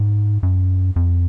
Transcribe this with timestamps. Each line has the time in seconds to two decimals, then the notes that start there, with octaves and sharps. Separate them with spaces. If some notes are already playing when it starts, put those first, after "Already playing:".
Already playing: G#2
0.43 F#2
0.96 F2